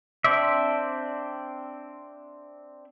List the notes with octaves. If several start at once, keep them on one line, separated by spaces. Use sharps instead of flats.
C4 D4 C5 D5 E5